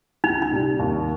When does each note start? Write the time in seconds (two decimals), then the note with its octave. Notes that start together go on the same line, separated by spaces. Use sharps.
0.24 C#2 D#4
0.42 D#4
0.52 C3 G3
0.79 D#2